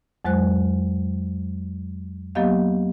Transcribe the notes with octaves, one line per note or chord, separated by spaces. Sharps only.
F2 F#3 G#3 C5 F#6
F#3 A#3 B3 G4 D#5 F5